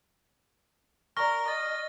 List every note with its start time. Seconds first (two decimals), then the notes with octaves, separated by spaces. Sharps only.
1.17 A#4 D5 C#6 F6 A#6 G7
1.48 D#5 A6